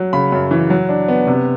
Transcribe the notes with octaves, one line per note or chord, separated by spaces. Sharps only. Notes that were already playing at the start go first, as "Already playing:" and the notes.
Already playing: F#3
C#3 B5
F#2
E3
F#3
D4
B3
C3